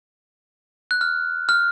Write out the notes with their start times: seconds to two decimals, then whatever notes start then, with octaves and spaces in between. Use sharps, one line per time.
0.91 F#6
1.01 F6
1.49 F6